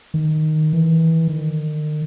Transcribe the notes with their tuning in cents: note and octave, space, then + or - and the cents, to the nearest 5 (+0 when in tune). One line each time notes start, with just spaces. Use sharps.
D#3 -5
E3 -20
D#3 -40